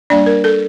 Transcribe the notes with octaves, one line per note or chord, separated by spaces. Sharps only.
G3 A#3 D4 D5
A#4
A4